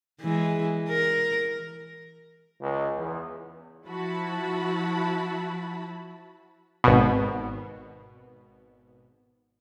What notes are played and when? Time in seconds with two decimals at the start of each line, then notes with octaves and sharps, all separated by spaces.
0.21 E3 G#3
0.88 A#4
2.61 C#2
2.98 E2
3.86 F3 E4 F#4 A5 B5
6.84 G#1 B2